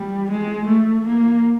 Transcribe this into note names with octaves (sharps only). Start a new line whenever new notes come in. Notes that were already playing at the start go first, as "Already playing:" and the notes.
Already playing: G3
G#3
A3
A#3